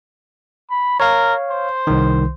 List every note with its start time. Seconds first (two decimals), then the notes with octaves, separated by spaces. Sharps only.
0.70 B5
1.00 A#4 C#5 F5
1.50 C5
1.87 C2 D#3